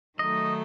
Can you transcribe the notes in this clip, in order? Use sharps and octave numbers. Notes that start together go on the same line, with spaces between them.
D#3 F#3 A3 D#4 D#5